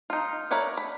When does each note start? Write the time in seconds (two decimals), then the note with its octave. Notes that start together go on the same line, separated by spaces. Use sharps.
0.10 D#4 F4
0.51 A#4 B4 C#5 D5 E5
0.77 B5